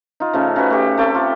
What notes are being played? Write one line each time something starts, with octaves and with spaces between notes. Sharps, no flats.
D#4 F4
C#3 F3 A3
C#3 D#4 F#4 B4
A3 G4
A3 C4 G5 A5
F4